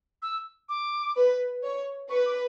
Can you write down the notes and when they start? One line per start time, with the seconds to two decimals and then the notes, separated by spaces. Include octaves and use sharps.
0.22 E6
0.69 D6
1.16 B4
1.63 C#5
2.09 B4 C#6
2.26 D6